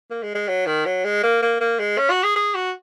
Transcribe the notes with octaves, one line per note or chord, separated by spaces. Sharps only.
A#3
G#3
G#3
F#3
D#3
F#3
G#3
A#3
A#3
A#3
G#3
C#4
F#4
G#4
G#4
F#4